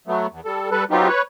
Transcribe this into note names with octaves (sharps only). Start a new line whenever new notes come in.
F#3 A3 B3
E2
G3 A4
G3 A4 B4
F#3 B3 C4 D#4 F4 G4
B4 C#5